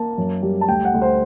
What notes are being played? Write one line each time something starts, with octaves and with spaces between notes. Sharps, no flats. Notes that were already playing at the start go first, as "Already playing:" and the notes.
Already playing: A#3 A5
F#2
G3
A5
D2 G5
F#5
D2
C5